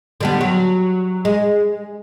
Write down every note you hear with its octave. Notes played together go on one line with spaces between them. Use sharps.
D3 G3 B3
F#3
G#3